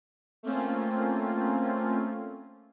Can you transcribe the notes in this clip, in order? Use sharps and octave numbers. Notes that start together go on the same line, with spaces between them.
A3 A#3 C4 C#4 F4